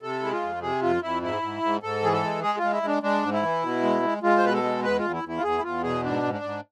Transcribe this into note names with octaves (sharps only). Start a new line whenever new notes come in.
C3 A4
G#3 E4
F4
F2
C3 G#4
F2 F4
F2 E4
G#2 E4
G#2
G#2
G#2 A4
E3 G#4
A4
G#3
G#3 G#4
G#3 F4
E4
G#3 D4
G#3 D4
G#2
E4
E3
B2
G#3
G#3
G#3 F4
C5
B2 B4
A4
G#3
E2 B4
E2 F4
E4
E2 E4
F4
E2 G#4
E4
E2 F4
B2 G#4
G#2 D4
G#2
D4
G#2